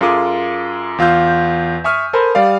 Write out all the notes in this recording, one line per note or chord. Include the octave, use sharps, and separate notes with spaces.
F#2 F4 G#4 A4 D6 D#6
E2 F4 E6 G6
E5 G#5 C#6 D#6 F6
A4 A#4 C5 G#5 B5
G3 D5 F5